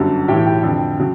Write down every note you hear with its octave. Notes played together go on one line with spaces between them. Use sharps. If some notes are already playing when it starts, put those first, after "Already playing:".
Already playing: G1 F#2 D3 G3
B1 A2 E3 G4 G5
G4 G5
F2 D3 G3
C#3 F#3